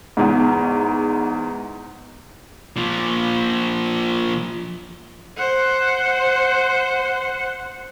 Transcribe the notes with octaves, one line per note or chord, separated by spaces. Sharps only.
E2 G#2
A#2 F3
C5 F#5